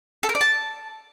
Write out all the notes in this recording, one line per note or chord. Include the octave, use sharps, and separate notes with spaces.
A4
A#4
D5
A5